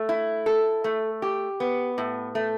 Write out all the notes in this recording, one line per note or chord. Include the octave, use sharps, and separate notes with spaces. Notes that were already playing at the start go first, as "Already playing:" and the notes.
Already playing: A3
E4
A4
A3
G4
B3
A2
A3